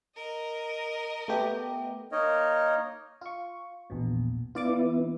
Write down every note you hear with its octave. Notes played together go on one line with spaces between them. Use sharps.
A#4 D#5
A3 B3 G4
A#3 D#4 A#4 C#5 D#5
F4 C#6
A#1 E2 B2
B3 E4 F4 D5 D6
E3